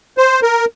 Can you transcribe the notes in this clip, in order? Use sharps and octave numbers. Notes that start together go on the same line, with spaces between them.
C5
A#4